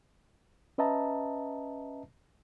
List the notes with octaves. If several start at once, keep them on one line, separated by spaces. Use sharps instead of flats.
C#4 B4 D#5 E5 A5 A#5